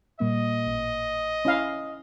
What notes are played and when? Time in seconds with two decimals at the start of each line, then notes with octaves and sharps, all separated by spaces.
0.20 A#2 G3 A#3 D#5
0.67 A1
1.45 C#4 E4 F5